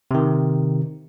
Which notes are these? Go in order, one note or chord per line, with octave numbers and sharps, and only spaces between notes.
C3 D#3